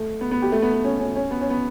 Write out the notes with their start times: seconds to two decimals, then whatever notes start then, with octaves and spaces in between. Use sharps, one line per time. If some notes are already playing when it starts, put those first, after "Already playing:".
Already playing: A3
0.21 B3
0.31 B3
0.42 G4
0.52 A3
0.62 B3
0.73 B3
0.84 C#4
1.00 C#4
1.15 C#4
1.31 B3
1.41 C#4
1.50 B3